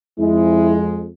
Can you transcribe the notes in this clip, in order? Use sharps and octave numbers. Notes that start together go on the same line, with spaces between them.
F2 G#3 E4